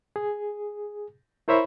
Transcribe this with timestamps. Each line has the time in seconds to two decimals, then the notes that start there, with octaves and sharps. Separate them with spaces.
0.16 G#4
1.48 E4 A#4 C5 C#5 E5 B5